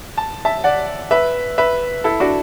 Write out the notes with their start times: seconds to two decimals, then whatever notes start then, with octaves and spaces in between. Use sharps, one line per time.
0.17 A5
0.45 E5 A5
0.64 D5 F#5
1.11 B4 E5
1.58 B4 E5
2.04 E4 A4
2.20 D4 F#4